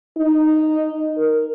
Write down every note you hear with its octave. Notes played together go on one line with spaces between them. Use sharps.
D#4
A#4